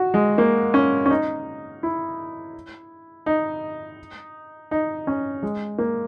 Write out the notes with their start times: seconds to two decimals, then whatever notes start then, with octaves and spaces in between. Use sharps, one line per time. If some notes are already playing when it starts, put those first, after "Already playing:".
Already playing: F#4
0.14 G#3
0.38 A#3
0.74 C#4
1.06 C#4
1.10 D#4
1.83 E4
3.26 D#4
4.71 D#4
5.07 C#4
5.43 G#3
5.78 A#3